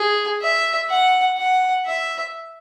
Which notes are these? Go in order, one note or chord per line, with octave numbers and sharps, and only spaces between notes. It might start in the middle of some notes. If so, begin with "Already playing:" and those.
Already playing: G#4
E5
F#5
F#5
E5